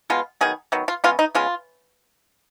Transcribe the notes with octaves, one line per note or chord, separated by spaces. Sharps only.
B2 G#3 B3 F4
D#3 F#3 B3 G#4
D#3 F#3 B3
F4
C#3 G#3 B3 F4
D#4
C#3 G#3 B3 F4